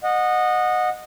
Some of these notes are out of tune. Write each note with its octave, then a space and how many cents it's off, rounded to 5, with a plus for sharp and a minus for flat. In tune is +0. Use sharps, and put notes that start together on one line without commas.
D#5 -15 F#5 -20